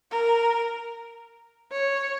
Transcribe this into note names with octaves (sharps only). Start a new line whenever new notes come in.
A#4
C#5